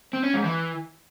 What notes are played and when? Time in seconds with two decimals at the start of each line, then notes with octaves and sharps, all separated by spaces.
0.13 C4
0.23 C#4
0.33 G#2
0.44 E3